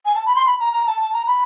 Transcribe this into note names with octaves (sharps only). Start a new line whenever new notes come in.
G#5
A5
B5
C6
B5
A#5
A#5
A5
A5
A#5
B5